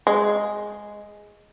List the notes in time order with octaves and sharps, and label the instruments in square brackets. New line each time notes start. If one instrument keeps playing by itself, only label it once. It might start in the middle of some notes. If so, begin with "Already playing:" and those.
[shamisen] G#3